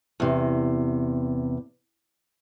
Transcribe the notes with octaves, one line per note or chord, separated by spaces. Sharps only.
E2 C3